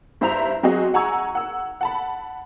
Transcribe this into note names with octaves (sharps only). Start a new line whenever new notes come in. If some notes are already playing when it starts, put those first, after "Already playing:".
G2 E4 C5 E5 A#5 F7
F#3 C4 F#4 G#4 D#5
F#5 G#5 A#5 C#6 E6 G#6
F#5 E6
F#5 A5 B5